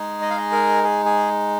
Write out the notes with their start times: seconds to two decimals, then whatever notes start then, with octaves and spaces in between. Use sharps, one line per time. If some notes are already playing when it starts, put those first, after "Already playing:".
Already playing: G#3 D#4 G#4
0.22 D#5
0.30 F5
0.38 D#5
0.52 A#4
0.83 G#4
1.06 G#4